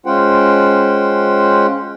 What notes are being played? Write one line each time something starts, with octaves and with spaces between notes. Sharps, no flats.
G#3 C#4 F4 C5 F#5 G5